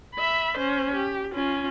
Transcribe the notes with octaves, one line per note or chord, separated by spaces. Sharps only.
E5 B5
C#4 C5
G4
C#4 F4